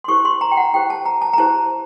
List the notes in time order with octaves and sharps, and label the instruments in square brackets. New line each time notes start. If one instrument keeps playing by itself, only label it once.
[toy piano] C6
E4 G4 C5 C#6
C6
A#5
G5
F#5
E4 G4 C5 G5
A5
A#5
A5
A#5
E4 G4 C5 A5